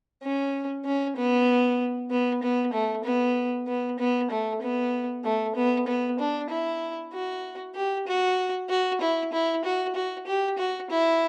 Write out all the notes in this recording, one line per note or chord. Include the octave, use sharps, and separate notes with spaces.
C#4
C#4
B3
B3
B3
A3
B3
B3
B3
A3
B3
A3
B3
B3
D4
E4
F#4
G4
F#4
F#4
E4
E4
F#4
F#4
G4
F#4
E4